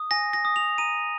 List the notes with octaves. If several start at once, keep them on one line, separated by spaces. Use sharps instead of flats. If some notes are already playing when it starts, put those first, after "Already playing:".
Already playing: D#6
G#5 A#6
A#6
D#6
F7
A#5 D#7